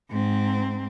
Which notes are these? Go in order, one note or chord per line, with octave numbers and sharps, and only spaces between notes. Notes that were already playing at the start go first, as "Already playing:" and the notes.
G#2 C4